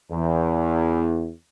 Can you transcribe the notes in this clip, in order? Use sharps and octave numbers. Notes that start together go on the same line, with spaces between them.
E2